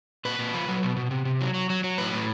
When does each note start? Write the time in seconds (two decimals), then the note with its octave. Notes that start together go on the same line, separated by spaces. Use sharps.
0.25 A#2 B4
0.39 A#2
0.54 F3
0.68 F#3
0.83 B2
0.96 B2
1.11 C3
1.25 C3
1.41 F#3
1.54 F#3
1.70 F#3
1.84 F#3
1.98 A2 B4
2.13 A2